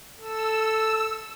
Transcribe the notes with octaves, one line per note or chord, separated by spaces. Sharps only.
A4 E6